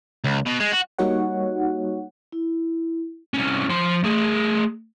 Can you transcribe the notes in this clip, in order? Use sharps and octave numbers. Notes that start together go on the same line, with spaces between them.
C#2
B2
G#3
F#4
G3 A#3 D#4 F#4 C#5 F#5
E4
C2 C#4
F3 C6
A3 G#4